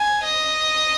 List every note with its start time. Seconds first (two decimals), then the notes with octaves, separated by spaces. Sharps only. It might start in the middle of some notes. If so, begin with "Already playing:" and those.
Already playing: G#5
0.24 D#5